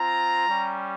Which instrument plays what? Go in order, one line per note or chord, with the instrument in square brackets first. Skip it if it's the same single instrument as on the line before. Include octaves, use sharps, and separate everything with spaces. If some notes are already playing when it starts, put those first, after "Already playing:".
Already playing: [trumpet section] C4 F4 A#5
G3 C#4 G4